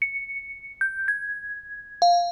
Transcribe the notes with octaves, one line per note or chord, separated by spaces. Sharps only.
C#7
G6
G#6
F5